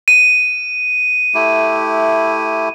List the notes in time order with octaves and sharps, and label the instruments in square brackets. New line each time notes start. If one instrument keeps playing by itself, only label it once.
[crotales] D#7
[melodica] A3 E4 G4